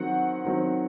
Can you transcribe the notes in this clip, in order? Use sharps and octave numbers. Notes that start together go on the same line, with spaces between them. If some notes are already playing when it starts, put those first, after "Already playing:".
Already playing: D#3 F#3 C4 F#5
D#3 F#3 C4